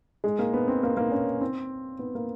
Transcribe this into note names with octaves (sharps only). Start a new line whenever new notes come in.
G#3
A#3
B3
C4
A#3
A#3
C#4
C4
B3
A#3